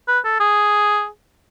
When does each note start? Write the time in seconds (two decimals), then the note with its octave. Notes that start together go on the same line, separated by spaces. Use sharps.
0.08 B4
0.24 A4
0.40 G#4